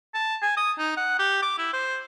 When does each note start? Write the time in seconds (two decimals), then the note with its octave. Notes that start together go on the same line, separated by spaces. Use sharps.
0.14 A5
0.42 G#5
0.57 D#6
0.78 D#4
0.97 F#5
1.19 G4
1.42 D6
1.58 E4
1.73 C5